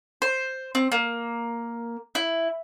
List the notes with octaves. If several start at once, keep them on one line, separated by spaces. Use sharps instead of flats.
C5
C4
A#3
E4